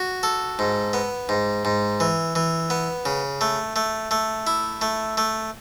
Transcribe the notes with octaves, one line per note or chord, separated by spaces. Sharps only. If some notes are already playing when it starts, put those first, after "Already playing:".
Already playing: F#4
A4
G#2
B3
G#2
G#2
E3
E3
B3
C#3
A3
A3
A3
E4
A3
A3